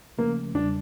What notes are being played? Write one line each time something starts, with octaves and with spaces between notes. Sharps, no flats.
C#3 F3 A3 A#3 C#4
E2 C#3 G3 D4